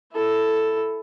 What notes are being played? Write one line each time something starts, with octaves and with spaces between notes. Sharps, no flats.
E4 A4